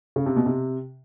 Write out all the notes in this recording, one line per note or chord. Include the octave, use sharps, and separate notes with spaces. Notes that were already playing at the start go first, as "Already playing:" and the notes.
C#3
C3
B2
C3